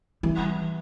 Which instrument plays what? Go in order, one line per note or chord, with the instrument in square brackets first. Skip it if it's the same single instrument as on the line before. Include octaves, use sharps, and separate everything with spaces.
[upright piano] E3 [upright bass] G3